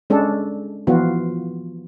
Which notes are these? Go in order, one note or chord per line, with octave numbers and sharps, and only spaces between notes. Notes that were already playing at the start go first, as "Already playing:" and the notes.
G#3 C#4 D4 A4
E3 F3 B3 F4 F#4